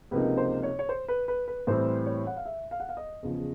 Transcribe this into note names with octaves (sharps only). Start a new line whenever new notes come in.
C#2 C3 F3 A#3 D#4 B4
C5
C#5
C#5
C5
B4
B4
B4
A2 E3 G3 C4 C5
C#5
F#5
F5
E5
F5
F#5
F5
D#5
E2 C#3 F3